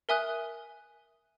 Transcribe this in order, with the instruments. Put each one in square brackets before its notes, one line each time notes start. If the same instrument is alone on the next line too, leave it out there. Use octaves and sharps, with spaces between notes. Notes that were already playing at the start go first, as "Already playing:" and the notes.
[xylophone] A#4 E5 G#5 D#6 F#6